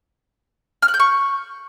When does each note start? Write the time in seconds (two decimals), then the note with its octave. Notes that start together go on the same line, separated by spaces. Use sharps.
0.82 F6
0.88 F#6
0.94 G6
0.99 C#6